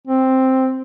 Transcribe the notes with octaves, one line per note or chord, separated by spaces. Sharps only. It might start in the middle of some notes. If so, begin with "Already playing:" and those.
C4